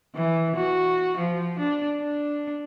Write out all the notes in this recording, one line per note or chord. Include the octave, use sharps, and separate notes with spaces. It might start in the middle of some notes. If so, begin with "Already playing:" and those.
E3
F#4
F3
D4
D4